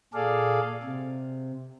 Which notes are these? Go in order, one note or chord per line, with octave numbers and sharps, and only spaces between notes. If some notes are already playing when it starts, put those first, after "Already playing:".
A#2 G#4 A4 D5 F5
C3